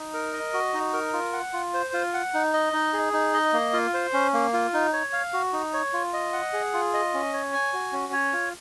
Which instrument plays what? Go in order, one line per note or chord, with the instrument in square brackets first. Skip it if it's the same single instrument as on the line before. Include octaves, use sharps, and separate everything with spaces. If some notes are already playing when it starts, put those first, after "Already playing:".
Already playing: [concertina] D#4
A#4
D#5
F#4
D#4
A#4
F4
F#5
F4
C5
F4
F#5
D#4
D#5
D#4
G#4
D#4
D#5
A#3
F4
C5
C#4
A#3
F4
D#4
C#5
F5
F#4
D#4
C#5
F4
D#5
F#5
G#4
F4
D#5
C#4
C#5
G#5
F#4
C#4
C#5
F4